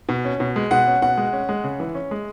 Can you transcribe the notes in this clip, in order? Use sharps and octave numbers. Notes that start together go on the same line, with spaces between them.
B2
C#4
B2
G#3
B2 F#5
C#4
B2 F#5
G#3
C#4
G#3
C#3
E3
C#4
G#3